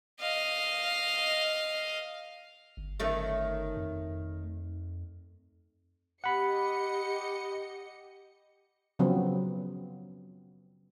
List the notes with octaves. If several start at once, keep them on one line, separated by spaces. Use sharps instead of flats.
D#5 F5
G1
D#3 A3 C#4
F2
G4 D#5 F#5 B5 C#7
C#3 F3 F#3 B3 C4